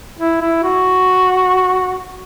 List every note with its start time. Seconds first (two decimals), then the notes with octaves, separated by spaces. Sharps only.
0.19 E4
0.41 E4
0.64 F#4